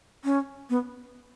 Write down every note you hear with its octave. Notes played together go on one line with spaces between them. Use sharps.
C#4
B3